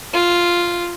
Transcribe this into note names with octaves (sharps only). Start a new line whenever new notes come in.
F4